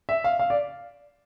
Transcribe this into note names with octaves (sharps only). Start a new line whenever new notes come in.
E5
F5
F5
D5